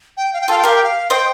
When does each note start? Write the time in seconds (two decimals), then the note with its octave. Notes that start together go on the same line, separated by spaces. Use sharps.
0.17 G5
0.33 F5
0.41 G5
0.48 F4 A4 F5
0.58 G5
0.63 G4 A#4 F5
0.75 G5
0.84 F5
1.10 C5 D#5 G5